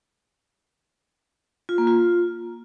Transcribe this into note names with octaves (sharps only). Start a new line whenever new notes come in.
F4
A#3
F4